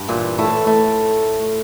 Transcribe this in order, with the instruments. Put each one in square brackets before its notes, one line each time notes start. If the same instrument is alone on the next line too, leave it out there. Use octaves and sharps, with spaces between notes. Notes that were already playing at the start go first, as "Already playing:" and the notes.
Already playing: [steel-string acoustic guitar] G2
[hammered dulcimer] A#2 [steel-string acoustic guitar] E3
[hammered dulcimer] A2 [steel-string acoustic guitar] A3
[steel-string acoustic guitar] A3